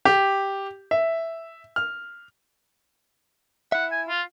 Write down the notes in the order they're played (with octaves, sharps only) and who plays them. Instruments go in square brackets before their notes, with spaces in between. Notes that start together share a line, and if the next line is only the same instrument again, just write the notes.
[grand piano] G4
E5
F6
[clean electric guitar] E4 E5 [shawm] F#5
[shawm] G#5
F4